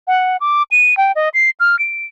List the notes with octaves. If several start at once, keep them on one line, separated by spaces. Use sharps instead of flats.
F#5
D6
D#7
G5
D#5
C7
F6
D7